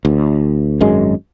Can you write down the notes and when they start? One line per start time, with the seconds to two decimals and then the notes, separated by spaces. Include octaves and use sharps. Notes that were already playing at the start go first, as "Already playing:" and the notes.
0.05 D2
0.81 G#1 F#2 G#3